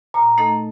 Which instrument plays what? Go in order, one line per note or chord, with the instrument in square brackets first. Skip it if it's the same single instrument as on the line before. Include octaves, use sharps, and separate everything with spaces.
[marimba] A#2 [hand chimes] A#5
[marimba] A3 D#4 A4 D#5